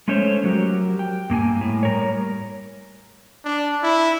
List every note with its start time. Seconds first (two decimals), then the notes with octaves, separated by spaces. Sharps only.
0.08 G#3 A3 C#4 C5 C#5
0.44 F#3 F#4 G4 A#4
0.99 G5
1.30 G2 A#3 G#4 G#5
1.61 A2
1.83 G3 A#4 C#5
3.45 D4
3.83 E4